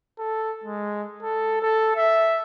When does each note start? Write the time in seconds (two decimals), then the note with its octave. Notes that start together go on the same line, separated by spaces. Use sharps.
0.19 A4
0.64 G#3
1.23 A4
1.62 A4
1.96 E5